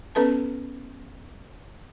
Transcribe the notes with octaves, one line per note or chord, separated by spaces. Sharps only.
B3 C#4 A4 B4 A5